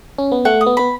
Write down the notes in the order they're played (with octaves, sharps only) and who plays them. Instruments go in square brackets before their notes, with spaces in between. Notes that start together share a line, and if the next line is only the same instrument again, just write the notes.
[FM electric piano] C#4
B3
[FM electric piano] A3 [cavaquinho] F#5
[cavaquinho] D#6
[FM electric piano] B3
[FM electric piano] B3 [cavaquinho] B5